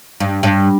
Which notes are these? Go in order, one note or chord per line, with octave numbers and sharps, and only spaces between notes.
G2
G2